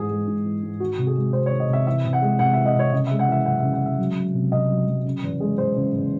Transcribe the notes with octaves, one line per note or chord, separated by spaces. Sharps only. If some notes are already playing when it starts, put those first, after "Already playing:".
Already playing: G#2 E3 G#4
G#3
G#2
E3
G#2
D#3 F#4
C3
G#4
G#3
C3 C5
C#5
D#3
D#5
C3 E5
E3 E5
C3
F#5
G#3
C3 F#5
E5
E3
D#5
C3 C#5
C#3 D#5
E5
G#3
F#5
E3 E5
F#2 F#5
E5
C#3
F#5
G#3
E5
F#3
F#3
C3
C3 D#5
F#3
F#3
C#3
E2
G#3
E2 C5
C#3
E2